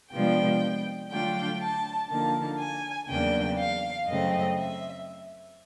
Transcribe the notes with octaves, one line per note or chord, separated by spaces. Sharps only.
C3 F3 G#3 B3 D4 G5
D3 F#3 A3 D4 F4 G5
A5
D3 F3 A#3 D#4 A5
G#5
E2 C#3 F#3 A#3 D4 G5
F5
F#2 C#3 F#3 A3 C4 D#5
E5